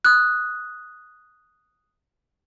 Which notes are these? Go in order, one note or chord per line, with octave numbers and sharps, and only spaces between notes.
D#6 F#6